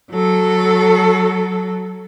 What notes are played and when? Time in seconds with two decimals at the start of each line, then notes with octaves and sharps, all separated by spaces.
0.11 F#3 A4